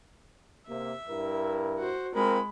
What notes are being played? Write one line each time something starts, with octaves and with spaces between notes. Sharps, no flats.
C3 A#3 E5
G2 E4 A#4
F#4 C5
G#3 C4 F4 A#4 B5